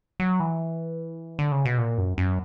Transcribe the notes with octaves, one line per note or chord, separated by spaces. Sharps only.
F#3
E3
D3
C#3
B2
A#2
F#2
F#2